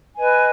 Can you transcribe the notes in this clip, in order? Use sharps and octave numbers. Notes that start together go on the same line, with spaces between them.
B4 D#5 G#5